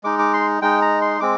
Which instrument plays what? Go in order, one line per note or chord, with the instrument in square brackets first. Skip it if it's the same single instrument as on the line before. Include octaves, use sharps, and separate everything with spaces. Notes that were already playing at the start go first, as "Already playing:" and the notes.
[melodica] G#3 D#4 D6
D6
C6
G#3 D#4 G5
A#5
C6
G#3 C4 D6